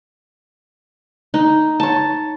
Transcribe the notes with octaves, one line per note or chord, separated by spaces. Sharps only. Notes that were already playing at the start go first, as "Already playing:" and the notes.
D#4
C#5 A5